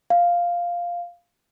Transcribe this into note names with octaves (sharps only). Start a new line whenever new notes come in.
F5